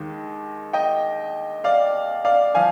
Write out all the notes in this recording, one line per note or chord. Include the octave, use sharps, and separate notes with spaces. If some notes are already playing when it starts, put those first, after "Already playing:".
Already playing: D#2 D#3 G#3
D#5 G5
D5 F5
D5 F5
F3 F5 G#5